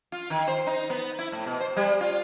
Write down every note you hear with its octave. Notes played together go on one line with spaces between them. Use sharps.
F4
D#3
C5
D#4
B3
E4
A2
B2
C5
G3
F4